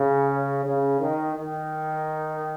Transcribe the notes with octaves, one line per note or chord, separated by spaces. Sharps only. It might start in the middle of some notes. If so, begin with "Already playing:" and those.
Already playing: C#3
C#3
D#3
D#3